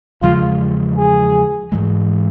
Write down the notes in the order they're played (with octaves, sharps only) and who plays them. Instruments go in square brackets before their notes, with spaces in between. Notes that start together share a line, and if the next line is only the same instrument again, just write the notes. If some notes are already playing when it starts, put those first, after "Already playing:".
[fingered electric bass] E2 C#3 F3 G#3 [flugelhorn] F4
[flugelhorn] G#4
[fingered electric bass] G#2 E3 G#3